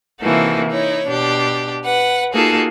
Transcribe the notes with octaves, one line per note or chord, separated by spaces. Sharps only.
C3 E3 A#3 D#4 F#4 A4
D#4 E4 C#5
B2 D4 G4
B4 F#5
A#3 D#4 F4 F#4 G#4 A4